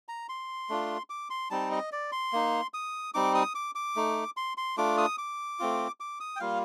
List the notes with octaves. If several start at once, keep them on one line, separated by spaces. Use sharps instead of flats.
A#5
C6
A3 D4 F4
D6
C6
G3 C4 D#4 A5
D#5
D5
C6
A#3 D#4
D#6
G3 C4 D#4 D6
D#6
D6
D6
A3 D#4
C6
C6
A3 D4 F4 D6
D#6
D6
A3 C4 F4
D6
D#6
G5
G3 A#3 F4 F5